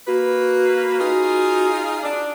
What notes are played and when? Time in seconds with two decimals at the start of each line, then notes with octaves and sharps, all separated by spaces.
0.07 A#3 F#4 B4
0.99 D#4 F4 G#4
2.04 D4